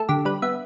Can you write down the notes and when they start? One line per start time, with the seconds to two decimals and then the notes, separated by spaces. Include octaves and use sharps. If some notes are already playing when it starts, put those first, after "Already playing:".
Already playing: A3 A4
0.09 D3 G4
0.25 G3 B4
0.42 B3 E5